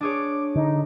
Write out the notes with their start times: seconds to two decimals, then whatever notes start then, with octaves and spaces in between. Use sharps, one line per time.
0.01 D4 G#4 C#5 D6
0.56 D3 D#4